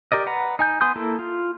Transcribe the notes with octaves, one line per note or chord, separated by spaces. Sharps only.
G4 A#4 D5 D#5
B4 F#5 A#5
D#4 G#5 G6
B3 G#5 C6 D#6 G6
A#3 E4 A4
F4